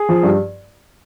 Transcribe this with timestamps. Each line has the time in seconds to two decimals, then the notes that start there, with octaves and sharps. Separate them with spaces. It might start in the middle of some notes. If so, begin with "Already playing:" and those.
Already playing: G#4
0.09 F3
0.23 G2